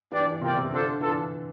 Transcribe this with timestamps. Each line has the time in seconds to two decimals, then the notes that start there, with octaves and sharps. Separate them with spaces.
0.11 E3 D4 G4 D5
0.26 E3
0.41 C3 A#3 F4 A#4 D5 G5
0.56 C3
0.71 D3 D4 F4 A4 C5
1.01 E3 D4 F4 A4